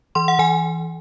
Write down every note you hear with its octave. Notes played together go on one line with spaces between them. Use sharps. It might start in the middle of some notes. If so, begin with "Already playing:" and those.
E3 C6
F#5
E3 G#5